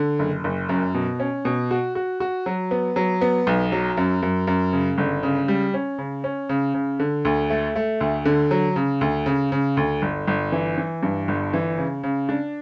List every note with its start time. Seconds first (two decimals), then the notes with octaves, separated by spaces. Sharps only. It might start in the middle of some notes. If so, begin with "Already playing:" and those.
Already playing: D3
0.19 F#1
0.44 F#1
0.69 F#2
0.94 B2
1.20 C#4
1.45 B2
1.71 F#4
1.95 F#4
2.20 F#4
2.46 F#3
2.71 B3
2.96 F#3
3.21 B3
3.47 B1
3.72 F#3
3.97 F#2
4.22 F#2
4.47 F#2
4.73 C#3
4.98 G1
5.23 C#3
5.48 G3
5.74 C#4
5.98 C#3
6.24 C#4
6.49 C#3
6.74 C#3
7.00 D3
7.25 D2
7.50 A3
7.76 A3
8.01 D2
8.25 D3
8.51 F#3
8.76 C#3
9.01 D2
9.26 C#3
9.52 C#3
9.77 D2
10.02 G1
10.27 G1
10.52 E3
10.78 E3
11.03 G2
11.28 G1
11.54 E3
11.78 C#3
12.03 C#3
12.29 D4